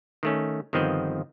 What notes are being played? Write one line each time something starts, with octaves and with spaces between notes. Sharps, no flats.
D#3 A3 C#4
G1 D#3 F3 B3 C4 D#5